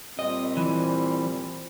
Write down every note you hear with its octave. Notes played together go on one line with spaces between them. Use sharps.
A#2 G3 C4 D#5
E3